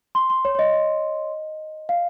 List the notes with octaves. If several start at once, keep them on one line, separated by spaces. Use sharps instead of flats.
C6
C6
C#5
C#5
D#5
D#5
F5